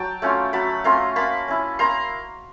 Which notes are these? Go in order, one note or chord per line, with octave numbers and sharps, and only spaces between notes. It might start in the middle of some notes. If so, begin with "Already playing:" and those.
Already playing: F#3 G5 A5
A3 C#4 F4
F#3 A5 B5
A3 C#4 F4 A#5 C6
A#3 A5 B5
C#4 E4
A#3 A#5 C6